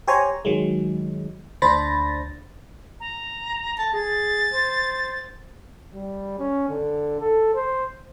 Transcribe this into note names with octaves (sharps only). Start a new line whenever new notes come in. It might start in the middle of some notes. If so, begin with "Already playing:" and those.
G4 C5 C#5 G#5 A#5
D#3 F#3 G#3
D2 D4 C5 B5 A6 A#6
A#5
A5 A#6
G#4 A6
C5
G3
C#4
D3
A4
C5